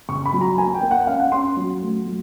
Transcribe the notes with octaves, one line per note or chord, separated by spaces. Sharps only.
C#3 C#6
B5
F#3
A#5
A#3 G#5
G5
A#3
F#5
C#4 F5
F#5
C#4 C6
F#3
A3
F#3